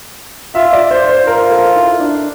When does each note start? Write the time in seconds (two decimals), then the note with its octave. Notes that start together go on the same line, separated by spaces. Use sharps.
0.55 F4 E5
0.73 D5
0.91 C5
1.09 C5
1.27 F4 A#4
1.51 A4
1.76 E4
2.00 D4